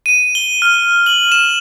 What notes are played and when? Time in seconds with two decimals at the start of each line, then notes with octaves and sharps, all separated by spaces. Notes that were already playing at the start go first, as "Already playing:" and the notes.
0.06 D#7
0.35 G7
0.62 F6
1.06 F#7
1.32 E7